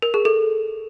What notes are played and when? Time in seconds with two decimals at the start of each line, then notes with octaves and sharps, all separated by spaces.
0.02 A#4
0.14 G#4
0.25 A4